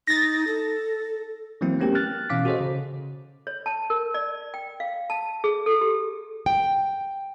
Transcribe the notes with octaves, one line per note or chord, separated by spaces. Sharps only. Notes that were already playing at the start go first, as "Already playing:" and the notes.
D#4 A6 A#6
A4
E3 F#3 A#3 C4 E4
A3 B3 C#4 G4 A#4 G5
F6 F#6 A6
B2 E3 C#4 F5 D6 B6
F#4 G#4 A4 C5 C#5 D#5
C#3
C#5
A5
A#4
D5
G5
F5
A5
G#4
A4
G4
G5